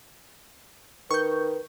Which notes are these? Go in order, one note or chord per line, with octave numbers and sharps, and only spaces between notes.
D#3 B4 C#6 G6